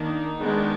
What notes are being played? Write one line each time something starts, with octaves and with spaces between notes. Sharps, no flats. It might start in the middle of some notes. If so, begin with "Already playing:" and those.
Already playing: D#3 A#3 D4
D#4
D#3 G#3 B3 D4